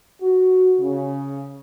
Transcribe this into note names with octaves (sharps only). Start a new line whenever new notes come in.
F#4
C#3